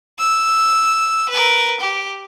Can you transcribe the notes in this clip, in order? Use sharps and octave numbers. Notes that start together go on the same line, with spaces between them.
E6
A#4 B4
G4